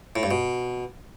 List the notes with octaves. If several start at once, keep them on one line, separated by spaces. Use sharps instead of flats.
A2
G2
B2